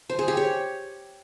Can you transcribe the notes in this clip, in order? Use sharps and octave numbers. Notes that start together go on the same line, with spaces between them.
C5
G#4
G4
C#5